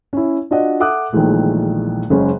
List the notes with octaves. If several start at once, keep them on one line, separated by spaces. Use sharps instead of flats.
C#4 E4
D4 F4 F#4 D5 D#5 F#5
A4 E5 F#5 D6 D#6 F#6
A#1 A#2 D#3 E3 G#3 A3
F#1 C#3 G#3 C#4